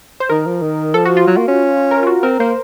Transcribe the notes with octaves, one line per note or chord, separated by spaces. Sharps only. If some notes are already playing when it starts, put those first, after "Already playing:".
C5
D#3 A#4
F3
D#3
F3 A4
F#4
F4
F#3
A#3
C#4
A#4
F4
F#4
C4 A#4
A#3 C5